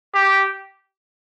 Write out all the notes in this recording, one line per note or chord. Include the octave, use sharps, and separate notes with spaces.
G4